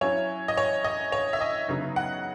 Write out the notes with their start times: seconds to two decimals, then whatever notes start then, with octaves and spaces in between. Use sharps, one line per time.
0.01 F#3 C#4 E4 C#5
0.48 D#5
0.57 C#5
0.84 D#5
1.12 C#5
1.33 E5
1.41 D#5
1.68 C#3 F#3 B3 D#4
1.96 F#5